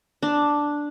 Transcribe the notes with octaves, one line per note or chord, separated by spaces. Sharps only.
D4